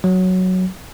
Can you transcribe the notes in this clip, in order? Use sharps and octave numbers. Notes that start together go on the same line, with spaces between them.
F#3